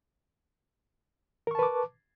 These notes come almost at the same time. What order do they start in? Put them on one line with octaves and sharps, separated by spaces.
A#4 C#6 A5 B4 D6